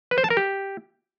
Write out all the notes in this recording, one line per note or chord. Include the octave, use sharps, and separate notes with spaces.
B4
C5
A5
A#4
G4